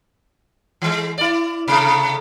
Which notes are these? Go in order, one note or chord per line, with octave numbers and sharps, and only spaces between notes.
E3 G#3
E4 D5
C3 A3